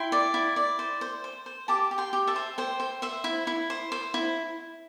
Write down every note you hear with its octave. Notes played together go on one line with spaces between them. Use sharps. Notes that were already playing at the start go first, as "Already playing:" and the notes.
Already playing: E4 G5 C6
D5
E4
D5
C5
C5
C5
C5
G4 A5 D6
G4
G5 C6
G4
E5 A5
C5
C5 G5
C5
C5 E5
E4
E4
C5
C5
E4